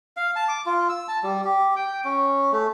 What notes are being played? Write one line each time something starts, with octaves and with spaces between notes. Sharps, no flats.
F5
A5
D6
F4
E6
A5
G3
G4
G5
C#4
A3